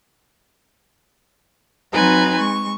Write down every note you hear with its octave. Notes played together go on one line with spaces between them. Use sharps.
F#3 C4 D#4 B4 G#5 A#5
G#3 C#6